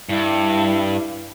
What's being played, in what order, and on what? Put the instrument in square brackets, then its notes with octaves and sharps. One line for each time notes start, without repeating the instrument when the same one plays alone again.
[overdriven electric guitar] G2 [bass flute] E4